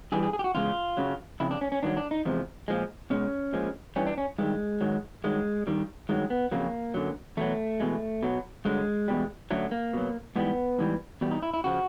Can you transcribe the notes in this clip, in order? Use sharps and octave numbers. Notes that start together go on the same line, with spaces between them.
G2 E3 G3 G#4
G#4
G#4
G4
F#4
E2 C#3 G#3 F4
F#2 C#3 F#3
F2 C#3 E4
D4
C#4
C#4
G2 D#3 F#3 D4
D4
D#4
E2 C3 F3 G#3
A#2 F3 G#3
B2 G#3 C#4
A#2 F3 G#3
G2 E3 G3 C#4
D4
C#4
G2 D#3 G3 G#3
G#2 D#3 F#3
G2 D#3 F#3 G#3
G2 D#3 G3
G2 D#3 F#3 G#3
B3
F2 C#3 F#3 A#3
F#2 D3 F#3
E2 B2 F#3 A3
E2 B2 G#3
B2 F#3
G2 D3 F#3 G#3
E2 B2 G3
F#2 D3 F#3 A3
A#3
B2 F#3
G#2 E3 G3 B3
G#2 E3 G3
E2 B2 G3
D#4
E4
E4
C#3 F3 F#4